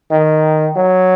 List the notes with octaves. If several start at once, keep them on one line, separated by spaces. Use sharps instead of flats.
D#3
F#3